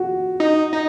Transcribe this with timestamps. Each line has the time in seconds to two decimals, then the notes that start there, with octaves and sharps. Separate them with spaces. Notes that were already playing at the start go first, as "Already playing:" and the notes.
Already playing: F#4
0.40 D#4
0.73 D#4